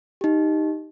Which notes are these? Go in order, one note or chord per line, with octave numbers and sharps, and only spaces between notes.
D#4 G4